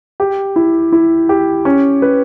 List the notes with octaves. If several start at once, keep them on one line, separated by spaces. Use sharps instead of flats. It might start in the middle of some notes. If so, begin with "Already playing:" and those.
G4
E4
E4
G4
C#4
B4